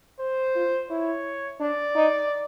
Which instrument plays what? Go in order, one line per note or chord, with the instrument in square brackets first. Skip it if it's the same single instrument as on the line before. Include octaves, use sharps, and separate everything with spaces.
[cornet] C5
[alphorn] F4
[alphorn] E4 [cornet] C#5
[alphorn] D4 [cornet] D5
[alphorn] D#4